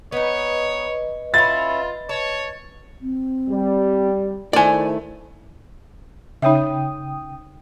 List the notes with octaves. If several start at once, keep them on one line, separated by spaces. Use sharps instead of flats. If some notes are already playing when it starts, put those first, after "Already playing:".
B3 D#4 B4 C#5 D#5
C#4 E4 F4 A6
C#5 A5
C4
G3
D#3 A3 E4 C5 D5 G#5
C#3 D#4 C#5 E5 G5 D#6